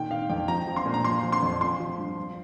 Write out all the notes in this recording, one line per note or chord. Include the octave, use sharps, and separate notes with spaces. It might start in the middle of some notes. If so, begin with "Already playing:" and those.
Already playing: A#2 D#3 G5
D#3 F5
F2 G5
F3 A#5
F3
C6
A#2
A#5
F3 C6
F3
C6
F2
F3 C6
F3
G2
F3